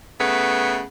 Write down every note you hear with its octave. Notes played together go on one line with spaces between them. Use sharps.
C#3 A3 B3